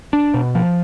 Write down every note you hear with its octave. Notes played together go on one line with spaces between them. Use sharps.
D4
B2
F3